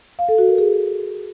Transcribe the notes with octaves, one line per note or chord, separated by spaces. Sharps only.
F5
A4
F#4
A#4
G#4